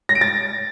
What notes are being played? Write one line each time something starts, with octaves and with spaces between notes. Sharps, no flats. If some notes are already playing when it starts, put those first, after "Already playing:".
A#6
D7
A6